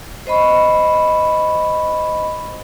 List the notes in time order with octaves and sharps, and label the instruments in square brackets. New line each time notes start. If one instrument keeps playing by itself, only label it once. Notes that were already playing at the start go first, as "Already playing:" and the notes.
[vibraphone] C5 D#5 B5 C#6